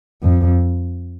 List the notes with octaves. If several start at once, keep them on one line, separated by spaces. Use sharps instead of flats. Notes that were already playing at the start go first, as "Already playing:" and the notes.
F2